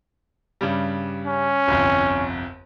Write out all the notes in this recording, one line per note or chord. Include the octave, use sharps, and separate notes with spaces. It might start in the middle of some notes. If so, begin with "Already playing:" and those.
G2 C#3 G3
C#4
G1 C2 F2